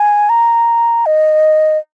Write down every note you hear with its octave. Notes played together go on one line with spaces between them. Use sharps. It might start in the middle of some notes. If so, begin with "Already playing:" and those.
Already playing: G#5
A#5
D#5